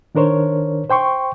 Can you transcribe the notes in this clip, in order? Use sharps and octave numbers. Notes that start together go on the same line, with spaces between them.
D#3 D4 A#4 C5 C#5
C5 G5 C6 C#6